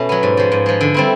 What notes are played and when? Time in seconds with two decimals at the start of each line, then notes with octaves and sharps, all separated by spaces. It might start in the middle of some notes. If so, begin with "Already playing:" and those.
Already playing: B2 A3 C#4
0.09 F#3 B3
0.23 G#2
0.37 F3 G#3
0.52 G#2
0.66 F3 G#3
0.81 D3
0.94 G3 C4 E4